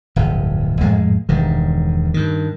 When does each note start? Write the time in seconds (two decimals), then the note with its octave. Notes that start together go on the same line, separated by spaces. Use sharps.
0.16 D1 G1 F2
0.81 G#1 F2 A2 G#3
1.29 E1 G2 D#3
2.14 G2 D#3